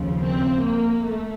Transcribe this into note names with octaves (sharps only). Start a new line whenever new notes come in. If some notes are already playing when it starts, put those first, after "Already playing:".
Already playing: D#2 C#3 F3
C4
A#3
A3